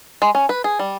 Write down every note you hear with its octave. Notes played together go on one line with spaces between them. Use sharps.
G#3
C#4
B4
G#4
G3